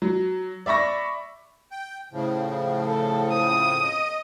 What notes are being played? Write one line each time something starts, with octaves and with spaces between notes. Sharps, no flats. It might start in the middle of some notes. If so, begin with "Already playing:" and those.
F#3
D5 E5 B5 C#6 A#6
G5
A2 C#3 F3
A4
D#6
D#5